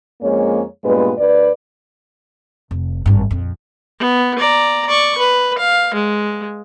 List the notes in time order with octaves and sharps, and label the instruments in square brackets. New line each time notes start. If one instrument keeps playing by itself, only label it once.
[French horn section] F2 G#3 A#3 C#4 C#5
G2 A#2 G#3 B3 B4
D2 B4 D5
[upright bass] F1
G#1 G2
A#1 F2
[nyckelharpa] B3
D5 A#5
D5 C#6
B4
F5
G#3